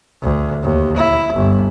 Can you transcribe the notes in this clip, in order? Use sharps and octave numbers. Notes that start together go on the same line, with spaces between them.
D2
D#2
E4
G1